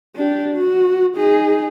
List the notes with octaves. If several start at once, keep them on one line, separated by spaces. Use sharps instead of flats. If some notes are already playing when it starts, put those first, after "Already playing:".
D4 G4
F#4
D#4 G#4